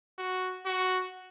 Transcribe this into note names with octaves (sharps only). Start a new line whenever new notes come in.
F#4
F#4